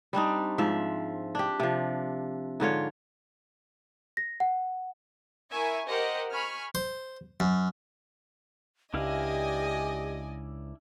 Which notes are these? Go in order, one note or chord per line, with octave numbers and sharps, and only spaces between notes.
G3 C4 D4 D#4
G#2 F3 E5
D4 G4
C3 F3
G#2 D3 F4 C#5
A#6
F#5
E4 A#4 E5 G#5 C#6
G4 A#4 C5 D#5 F#5
G#5 B5 C#6 F6
C5
F#2
C#2 D4 E4 G4 D5 D#5 F5 G#5